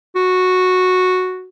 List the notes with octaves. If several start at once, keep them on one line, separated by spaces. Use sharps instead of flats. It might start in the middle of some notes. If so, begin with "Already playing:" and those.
F#4